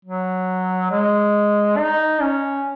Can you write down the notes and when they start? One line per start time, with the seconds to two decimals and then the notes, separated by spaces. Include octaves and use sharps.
0.05 F#3
0.91 G#3
1.77 D#4
2.21 C#4